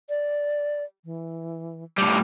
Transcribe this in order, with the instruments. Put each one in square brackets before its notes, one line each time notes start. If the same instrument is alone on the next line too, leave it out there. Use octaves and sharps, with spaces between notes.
[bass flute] D5
E3
[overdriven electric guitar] A2 G3